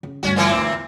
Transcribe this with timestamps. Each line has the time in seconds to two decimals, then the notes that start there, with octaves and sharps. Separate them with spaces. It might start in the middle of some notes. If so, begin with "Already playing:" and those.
0.03 C#3
0.23 D2 G2 C#4 F#4
0.36 A#2 E3 C4
0.54 D2 D#4
0.69 E2